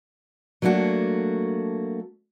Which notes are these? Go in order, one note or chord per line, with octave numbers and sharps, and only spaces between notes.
F#3 A3 A#3 D4 F#4